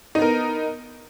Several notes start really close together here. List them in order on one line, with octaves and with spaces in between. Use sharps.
D#4 B3 A#4